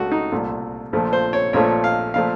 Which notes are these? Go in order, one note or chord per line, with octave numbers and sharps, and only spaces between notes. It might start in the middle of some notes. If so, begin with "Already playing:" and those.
Already playing: C#2 C#3 A3 F#4
D#4
C2 A#2 A3
A#1 A#2 F3 A3
C5
C#5
A#1 A#2 F3 A3 C#5
F5
A#2 F3 A3 F5